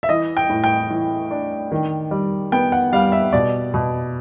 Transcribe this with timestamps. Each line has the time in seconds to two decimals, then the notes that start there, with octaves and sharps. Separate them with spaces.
0.03 E5
0.09 E3 D#5
0.37 G5
0.50 A2
0.64 G5
0.91 E3
1.31 D4
1.72 D#3
2.11 G3
2.52 B3 G5
2.72 F#5
2.93 G3 F5
3.12 E5
3.33 B2 D5
3.74 B2